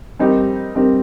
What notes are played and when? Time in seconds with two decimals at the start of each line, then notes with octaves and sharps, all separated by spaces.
0.19 G3 C4 D#4 G4 A#4
0.75 G3 C4 D#4 G4 A#4